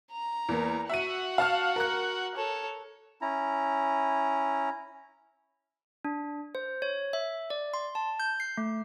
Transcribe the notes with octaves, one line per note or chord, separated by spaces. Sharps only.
A#5
E2 A#3
F#4 E5 F#5 D#7
F5 A5 F6
A#4 F#6
A4 C#5
C#4 E4 A#5
D4
C5
C#5
E5
D5
C6
A5
G6
C7
A3